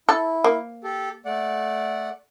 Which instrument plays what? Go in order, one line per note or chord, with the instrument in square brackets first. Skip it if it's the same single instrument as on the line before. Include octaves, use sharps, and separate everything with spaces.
[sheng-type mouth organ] E4 [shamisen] A4
[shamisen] A#3
[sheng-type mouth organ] G4 A4
A3 D5 F#5